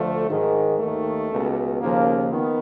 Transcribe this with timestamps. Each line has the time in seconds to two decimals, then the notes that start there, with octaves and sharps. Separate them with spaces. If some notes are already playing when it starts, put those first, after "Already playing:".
Already playing: D2 D3 F3 A3
0.29 G#2 D#3
0.79 D#2 D#3 A3
1.30 C#2 B2
1.81 D#2 C#3 F3 A#3
2.31 D#3 B3